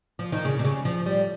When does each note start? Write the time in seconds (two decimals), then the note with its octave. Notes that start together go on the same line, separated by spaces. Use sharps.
0.19 F3
0.32 D#3
0.45 C#3
0.59 C3
0.65 C#3
0.85 F3
1.06 G3